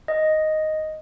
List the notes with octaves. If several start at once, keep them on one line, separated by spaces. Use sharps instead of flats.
D#5